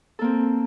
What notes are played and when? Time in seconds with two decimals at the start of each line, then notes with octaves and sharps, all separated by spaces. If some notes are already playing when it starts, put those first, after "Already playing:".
0.19 A4
0.21 A#3
0.24 C4